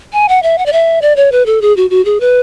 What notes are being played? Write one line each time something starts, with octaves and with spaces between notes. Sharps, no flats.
G#5
F#5
E5
F#5
D5
E5
D5
C#5
B4
A4
G#4
F#4
F#4
G#4
B4